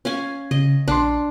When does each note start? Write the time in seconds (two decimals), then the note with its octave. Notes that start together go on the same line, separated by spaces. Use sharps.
0.05 C#4 F5 G#5
0.51 C#3 D#5
0.88 A#1 D4 C6